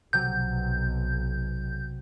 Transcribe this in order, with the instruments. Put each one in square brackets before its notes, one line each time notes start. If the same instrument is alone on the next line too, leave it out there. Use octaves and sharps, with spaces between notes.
[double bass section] B1 [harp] C3 F#3 [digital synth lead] G6